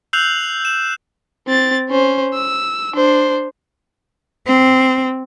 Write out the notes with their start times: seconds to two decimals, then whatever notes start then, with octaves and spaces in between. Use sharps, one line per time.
0.13 E6 F#6 G6 C7 F7 F#7
0.65 E7
1.48 C4 A6
1.89 C#4 C5
2.34 E6
2.94 D4 C5
4.47 C4